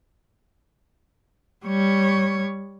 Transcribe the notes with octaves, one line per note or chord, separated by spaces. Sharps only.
G3 C#5